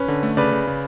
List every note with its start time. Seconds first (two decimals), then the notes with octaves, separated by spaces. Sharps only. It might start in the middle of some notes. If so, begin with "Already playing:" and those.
Already playing: C#4 B4
0.08 D3
0.23 A3
0.37 C#3 B4 D5
0.52 C#3
0.67 C#3